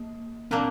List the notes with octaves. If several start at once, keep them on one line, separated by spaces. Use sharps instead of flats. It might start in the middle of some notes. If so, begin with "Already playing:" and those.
Already playing: A#3
A#2 F#3 A#3 C4 D4